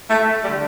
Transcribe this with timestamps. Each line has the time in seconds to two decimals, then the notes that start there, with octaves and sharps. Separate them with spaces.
0.10 A3
0.44 G3
0.48 D3